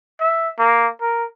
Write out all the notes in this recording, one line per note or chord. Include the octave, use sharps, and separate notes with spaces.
E5
A#3
A#4